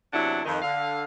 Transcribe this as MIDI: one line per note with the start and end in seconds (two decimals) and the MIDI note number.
0.14 0.41 40
0.14 0.41 48
0.14 0.41 54
0.14 0.41 62
0.14 0.41 64
0.14 0.41 78
0.45 0.59 41
0.45 0.59 51
0.62 1.04 50
0.62 1.04 77